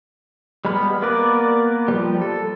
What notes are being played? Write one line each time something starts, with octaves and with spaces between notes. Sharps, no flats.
G3 G#3 B3 B5 F6
A#3 B3 A#4 B4 D5
F3 G3
A4